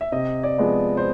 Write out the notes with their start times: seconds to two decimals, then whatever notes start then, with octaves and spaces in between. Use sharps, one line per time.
0.01 E5
0.12 C3 D#5
0.43 D5
0.58 F3 G#3 B3
0.97 C5